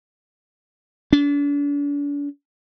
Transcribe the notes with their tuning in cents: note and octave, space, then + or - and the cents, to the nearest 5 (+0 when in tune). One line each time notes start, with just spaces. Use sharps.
D4 -40